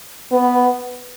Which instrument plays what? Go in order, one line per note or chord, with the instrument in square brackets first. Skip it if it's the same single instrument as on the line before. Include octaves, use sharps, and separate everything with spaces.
[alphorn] B3